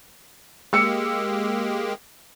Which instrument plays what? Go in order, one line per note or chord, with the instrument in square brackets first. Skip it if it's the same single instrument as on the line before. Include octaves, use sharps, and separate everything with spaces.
[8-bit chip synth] G#3 A#3 G4 [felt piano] E6 C#7